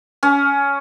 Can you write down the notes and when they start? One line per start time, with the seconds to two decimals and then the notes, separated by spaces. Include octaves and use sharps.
0.23 C#4